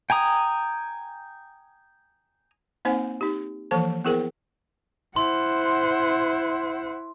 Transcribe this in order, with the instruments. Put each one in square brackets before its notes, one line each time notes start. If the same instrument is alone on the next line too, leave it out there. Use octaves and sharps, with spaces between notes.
[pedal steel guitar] G5 G#5 A#5 D#6
[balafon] A#3 C4 D#4 C5 F#5 G#5
D#4 G4
E3 F3 A#3 A4 C5 A5
B3 E4 G#4 A#4 C5 G5
[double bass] E4 [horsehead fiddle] C5 F#5 [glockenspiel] C6